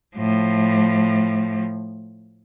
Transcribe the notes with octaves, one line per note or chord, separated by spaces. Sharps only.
A2 F3